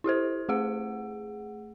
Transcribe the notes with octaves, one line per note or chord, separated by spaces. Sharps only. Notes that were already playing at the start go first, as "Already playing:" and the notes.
E4 G4 A4 C5
A3 G#4 F#5